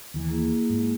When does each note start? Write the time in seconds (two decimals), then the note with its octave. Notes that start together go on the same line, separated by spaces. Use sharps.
0.14 D#2 E3
0.29 A#3 E4 G#4
0.70 G#2